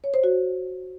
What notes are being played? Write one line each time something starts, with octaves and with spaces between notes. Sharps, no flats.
C#5
C5
F#4